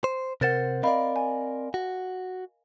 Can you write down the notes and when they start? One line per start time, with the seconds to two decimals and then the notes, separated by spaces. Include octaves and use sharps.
0.04 C5
0.41 C3 A#4 C5 F#5 A6 E7
0.83 C4 A#4 D5 D#5 F5 B5
1.16 G#5
1.74 F#4